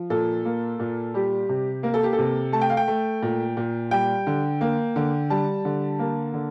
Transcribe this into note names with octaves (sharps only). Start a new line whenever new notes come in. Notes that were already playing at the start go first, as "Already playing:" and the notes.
Already playing: F3
A#2 A4
A#3
A#2
G3 G4
C3
A#3 A#4
A4
G4
A4
C3
A3 A5
G5
F5
G5
A3
A#2
A#2
G3 G5
D3
A#3
D3
G3 A5
D3
A#3
D3